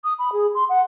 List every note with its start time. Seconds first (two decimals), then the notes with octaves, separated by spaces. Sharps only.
0.04 D#6
0.19 B5
0.33 G#4
0.55 C6
0.69 F#5